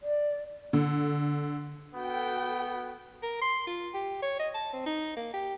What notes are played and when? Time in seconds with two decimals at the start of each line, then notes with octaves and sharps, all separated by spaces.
0.01 D5
0.73 D3
1.94 B3 F#4 A4 G5
3.23 A#4
3.41 C6
3.67 F4
3.94 G4
4.22 C#5
4.39 D#5
4.54 A5
4.73 C4
4.86 D#4
5.16 A#3
5.33 G4